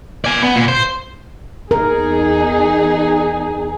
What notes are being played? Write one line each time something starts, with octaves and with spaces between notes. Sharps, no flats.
D5 G#5
B3
A#2
C5
E2 D#4 G#4 A#4